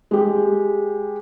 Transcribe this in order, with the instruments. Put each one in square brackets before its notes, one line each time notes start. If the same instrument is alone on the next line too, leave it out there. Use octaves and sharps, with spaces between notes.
[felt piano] G#3 G4